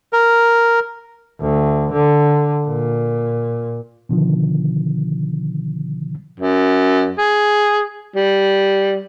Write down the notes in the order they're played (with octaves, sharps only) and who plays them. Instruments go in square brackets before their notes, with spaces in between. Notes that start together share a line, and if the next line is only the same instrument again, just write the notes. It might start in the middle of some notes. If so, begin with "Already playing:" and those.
[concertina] A#4
[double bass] D2
D3
A#2
[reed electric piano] B2 D3 D#3 F3
[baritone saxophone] F#2
G#4
G3